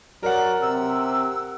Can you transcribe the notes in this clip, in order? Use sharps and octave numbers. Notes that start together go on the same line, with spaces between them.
F#3 A#4 D5 F#5
C3 E6